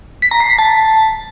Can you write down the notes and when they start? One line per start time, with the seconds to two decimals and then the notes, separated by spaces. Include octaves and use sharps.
0.22 B6
0.31 A#5
0.40 C7
0.49 B6
0.58 A5